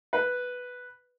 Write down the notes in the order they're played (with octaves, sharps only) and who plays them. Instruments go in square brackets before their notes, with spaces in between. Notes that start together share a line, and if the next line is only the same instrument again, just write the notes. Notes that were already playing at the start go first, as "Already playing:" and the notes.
[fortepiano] B4